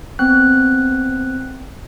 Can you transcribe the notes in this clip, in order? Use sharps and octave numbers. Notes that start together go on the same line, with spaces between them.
B3 C4 F#6